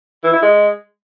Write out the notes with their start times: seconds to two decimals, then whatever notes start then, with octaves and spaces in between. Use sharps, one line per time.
0.24 E3
0.33 E4
0.42 G#3